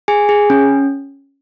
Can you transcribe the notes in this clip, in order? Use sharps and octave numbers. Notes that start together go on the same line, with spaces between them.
G#4 G#5
G#4
C#4